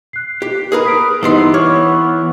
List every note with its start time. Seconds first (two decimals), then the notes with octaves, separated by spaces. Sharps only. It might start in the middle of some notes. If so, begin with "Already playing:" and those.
0.13 F#6 C7
0.42 G4
0.72 G#4 A#4 B4
0.85 D#6 B6 D7
1.23 G2 E3 B3 D#4 B4 C5 C6
1.54 C#5 C#6 D6 F6